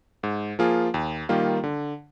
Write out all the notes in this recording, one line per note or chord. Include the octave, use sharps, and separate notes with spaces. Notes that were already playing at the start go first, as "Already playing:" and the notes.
G#2
F3 A#3 F4 G#4
D#2
D#3 G3 A#3 F4
D3